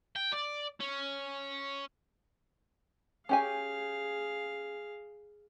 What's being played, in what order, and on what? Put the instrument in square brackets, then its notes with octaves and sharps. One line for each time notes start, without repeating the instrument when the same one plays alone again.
[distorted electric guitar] G5
D5
C#4
[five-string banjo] C#4 G4 G#5 [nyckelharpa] G#4 F5